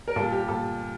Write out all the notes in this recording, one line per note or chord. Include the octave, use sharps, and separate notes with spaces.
A#4
A#2 G3 A4
G4
A#2 A4